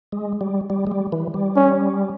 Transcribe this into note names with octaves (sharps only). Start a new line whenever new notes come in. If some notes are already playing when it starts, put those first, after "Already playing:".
G#3
G3
G3
G#3
G3
E3
G3
C#4